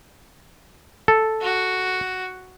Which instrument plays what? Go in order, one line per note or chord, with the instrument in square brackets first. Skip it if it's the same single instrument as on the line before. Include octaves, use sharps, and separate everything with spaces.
[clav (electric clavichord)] A4
[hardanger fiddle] F#4